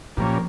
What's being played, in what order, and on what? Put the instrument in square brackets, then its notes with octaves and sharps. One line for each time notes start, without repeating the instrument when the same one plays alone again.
[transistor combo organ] A#2 G3 A#3 C#4 [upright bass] F3